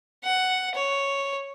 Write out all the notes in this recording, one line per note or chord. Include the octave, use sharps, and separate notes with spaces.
F#5
C#5